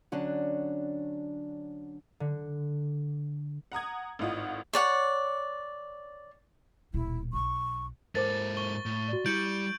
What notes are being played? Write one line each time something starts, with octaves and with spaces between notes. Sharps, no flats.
D3 F#3 C#4 D4
D3
F#5 A#5 D#6 G#6
G#1 A2 D#4 F4 F#5 D#6
C#5 D5 F#5
D#1 B2 E4
B1 C#6
G#2 A4 A#4 C5 D6 A6
C#6 G7
A2
F#4 D5
G3 E4 G6 C#7 D7 F#7